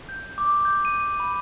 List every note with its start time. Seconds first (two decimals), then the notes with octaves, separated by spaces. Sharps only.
0.09 G6
0.38 D6
0.65 G6
0.85 D#7
1.20 B5